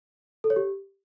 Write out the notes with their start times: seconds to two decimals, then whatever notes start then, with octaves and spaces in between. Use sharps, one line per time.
0.44 A4
0.50 C#5
0.56 G4